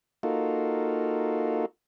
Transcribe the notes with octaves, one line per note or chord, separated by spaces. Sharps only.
A#3 D#4 F4 F#4 A4